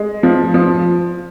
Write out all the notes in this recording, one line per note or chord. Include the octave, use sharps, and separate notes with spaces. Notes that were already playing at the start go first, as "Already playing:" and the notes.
Already playing: G#3
F3
F3